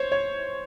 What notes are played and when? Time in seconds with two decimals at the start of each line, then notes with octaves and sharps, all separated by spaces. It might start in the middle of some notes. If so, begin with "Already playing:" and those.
Already playing: C5 C#5
0.12 C#5